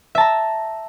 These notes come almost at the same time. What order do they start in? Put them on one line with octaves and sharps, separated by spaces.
E5 A5 A#5